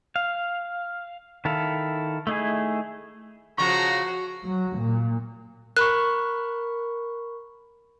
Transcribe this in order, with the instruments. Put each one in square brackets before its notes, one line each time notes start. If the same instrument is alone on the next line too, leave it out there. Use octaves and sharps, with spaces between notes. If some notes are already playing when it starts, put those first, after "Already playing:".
[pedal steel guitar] F5
D#3 E4 A4 F5
A3 D#4 E4 G#4
[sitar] C#3 F3 [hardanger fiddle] F#4 [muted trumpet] A#5 [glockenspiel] C#6
[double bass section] F#3
A#2
[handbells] A#4 B5 C#6 [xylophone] F#6